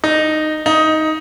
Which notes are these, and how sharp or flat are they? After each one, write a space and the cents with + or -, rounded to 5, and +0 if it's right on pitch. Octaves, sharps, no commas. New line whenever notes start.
D#4 -10
D#4 +10